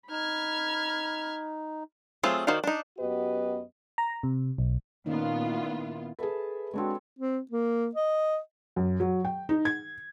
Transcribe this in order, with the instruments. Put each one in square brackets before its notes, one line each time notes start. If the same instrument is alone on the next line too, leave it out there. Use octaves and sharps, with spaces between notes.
[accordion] D#4 [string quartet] B5 F6 G#6
[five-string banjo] F#3 A3 C4 F4 G#4
D#3 F#4 C5 D5 F5
D4 D#4
[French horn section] F#2 B3 F#4 G4 B4 D#5
[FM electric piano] A#5
C3
B1
[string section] A#2 B3 F4 [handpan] D#3 C#4 D#4
[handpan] E4
[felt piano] G#4 A4 [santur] B4 E5 A5
[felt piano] G#3 D4 F#4 [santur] C4 A4 C#5
[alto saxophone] C4
A#3
D#5
[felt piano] F#2
F#3
G5
D#4
G#6